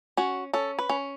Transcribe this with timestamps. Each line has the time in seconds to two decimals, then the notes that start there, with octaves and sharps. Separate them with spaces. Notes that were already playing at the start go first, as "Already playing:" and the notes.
0.17 C#4 F#4
0.53 C#4 A4
0.79 B4
0.89 C#4